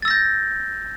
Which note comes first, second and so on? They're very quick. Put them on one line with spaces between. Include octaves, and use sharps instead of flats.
A6 E6 A#6 G6